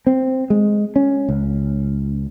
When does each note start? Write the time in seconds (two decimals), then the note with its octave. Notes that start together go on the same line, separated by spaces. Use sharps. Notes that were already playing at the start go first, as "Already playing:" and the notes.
0.07 C4
0.50 G#3
0.96 C#4
1.29 C#2